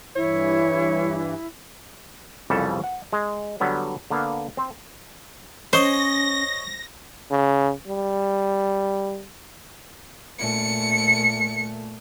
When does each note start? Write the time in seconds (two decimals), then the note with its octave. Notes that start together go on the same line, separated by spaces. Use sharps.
0.16 G2 E3 E4 C#5
2.50 C2 F2 C#3 E3 G3 A4
2.84 F#5
3.13 G#3
3.60 D3 F#3 G3 B3
4.10 D3 A#3 B3 F5
4.57 C4 C5
5.73 C#4 C5 C#5 D#5 A#6
7.31 C#3
7.87 G3
10.39 A#2 A3 C#7